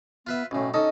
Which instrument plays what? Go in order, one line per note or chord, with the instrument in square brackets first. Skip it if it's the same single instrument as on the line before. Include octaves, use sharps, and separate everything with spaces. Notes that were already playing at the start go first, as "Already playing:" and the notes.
[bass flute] B3 [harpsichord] F4 B4 E5
[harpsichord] B1 A2 [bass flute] C#4
[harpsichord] C#4 A4 [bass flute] D#4 [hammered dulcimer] D#5